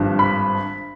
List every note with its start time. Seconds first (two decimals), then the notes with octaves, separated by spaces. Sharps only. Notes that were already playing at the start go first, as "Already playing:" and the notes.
Already playing: G#1 G2 F3
0.19 B5